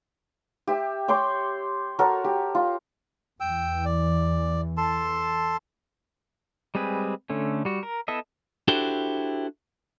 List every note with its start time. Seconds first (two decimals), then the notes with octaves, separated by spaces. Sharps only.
0.67 G4 E5
1.08 C#5 G5 C6 D6
1.99 F#4 A4 A#4 C#5
2.24 G4
2.55 F4
3.40 E2 E3 G5 E6
3.85 D5
4.77 A4 A5 C6
6.75 G3 G#3 C4 G#4 B4
7.30 D3 A3 C#4
7.65 G3 F#4
7.83 A#4
8.08 B3 E4 A4 D#5 E5
8.68 D4 E4 F#4 G4 A4 C5